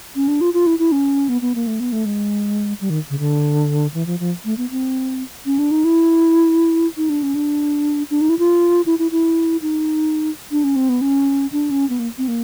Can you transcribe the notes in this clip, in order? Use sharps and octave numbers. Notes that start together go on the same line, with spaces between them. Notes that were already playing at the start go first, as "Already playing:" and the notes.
C#4
D4
F4
F4
E4
E4
C#4
B3
B3
A#3
A3
B3
A3
G#3
G3
D#3
C#3
D3
E3
F3
F3
A3
B3
C4
C#4
D4
D#4
E4
D#4
D4
C#4
D4
D4
D#4
E4
F4
E4
E4
E4
D#4
D4
C#4
C4
B3
C#4
D4
C#4
B3
A#3
C4
A#3